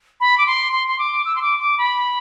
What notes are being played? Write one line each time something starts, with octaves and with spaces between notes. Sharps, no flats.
B5
D6
C6
C6
C6
D6
E6
C6
D6
D6
B5